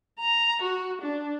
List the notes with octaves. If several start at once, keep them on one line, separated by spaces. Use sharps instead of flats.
A#5
F#4
D4